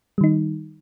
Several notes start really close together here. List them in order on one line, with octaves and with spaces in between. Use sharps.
G3 D#3 D#4